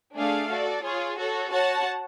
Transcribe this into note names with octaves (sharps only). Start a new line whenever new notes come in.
A3 D4 G#4 D5 F5
F#4 A4 D5
F4 G#4 C#5
F#4 A4 C#5
F#4 C#5 F#5 A5